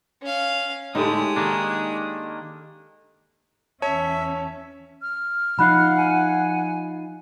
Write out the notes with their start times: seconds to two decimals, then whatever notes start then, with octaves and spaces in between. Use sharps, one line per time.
0.22 C#4 F5
0.95 A2 D3 G#3 D#4 G4 A4 D#6
1.36 D#3 A#3 D4
3.82 E2 C#4 C#5 E5 A5
5.01 F6
5.59 F3 D#4 F4 F#5 B5 F#6
5.97 G#5